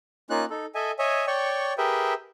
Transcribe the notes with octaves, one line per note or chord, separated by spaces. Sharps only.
A#3 C#4 D#4 F4 F#6
D#4 A4
A4 D#5 E5 G#5
C#5 D#5 E5 G#5
C#5 D5 G5 C#6
G4 G#4 A#4 B4 E5 G5